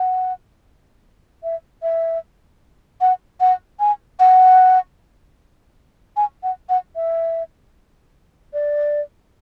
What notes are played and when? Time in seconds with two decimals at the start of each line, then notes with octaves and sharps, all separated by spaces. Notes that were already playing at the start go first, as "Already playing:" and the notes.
Already playing: F#5
1.43 E5
1.83 E5
3.01 F#5
3.40 F#5
3.80 G#5
4.20 F#5
6.17 G#5
6.43 F#5
6.69 F#5
6.96 E5
8.53 D5